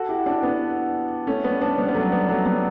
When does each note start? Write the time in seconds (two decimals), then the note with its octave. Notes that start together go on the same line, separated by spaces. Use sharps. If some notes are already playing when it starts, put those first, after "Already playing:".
Already playing: F#4 A4
0.09 E4 G4
0.26 D4 F#4
0.43 B3 D4
1.27 A3 C#4
1.44 G3 B3
1.61 B3 D4
1.78 G3 B3
1.88 B3
1.95 F#3 A3
2.12 G3 B3
2.28 F#3 A3
2.45 G3 B3